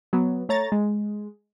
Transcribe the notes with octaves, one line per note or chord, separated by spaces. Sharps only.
F#3 B3
A3 C#5 A#5 A6
G#3